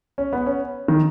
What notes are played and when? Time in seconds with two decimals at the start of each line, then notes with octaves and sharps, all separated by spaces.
0.18 C#4
0.33 B3
0.46 C#4
0.88 D#3